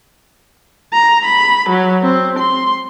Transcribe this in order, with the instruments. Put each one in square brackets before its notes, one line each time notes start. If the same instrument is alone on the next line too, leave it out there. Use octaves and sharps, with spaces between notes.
[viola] A#5
B5
F#3
C4
C6